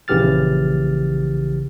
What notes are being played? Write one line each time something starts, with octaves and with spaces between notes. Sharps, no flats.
A#1 C#3 E3 G4 F6 A6